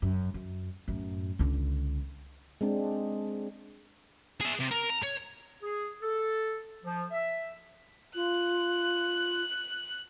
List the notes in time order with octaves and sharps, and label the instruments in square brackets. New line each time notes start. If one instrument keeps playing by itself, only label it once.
[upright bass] F#2
F#2
F#2 A2
C#2 D3
[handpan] G#3 C4 D4
[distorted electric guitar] G#4 E5
C3
A#4
A#5
C#5
[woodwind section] G#4
A4
F3
E5
[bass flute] F4 [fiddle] F#6